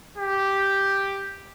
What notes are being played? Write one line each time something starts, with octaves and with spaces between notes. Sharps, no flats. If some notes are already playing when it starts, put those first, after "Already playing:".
G4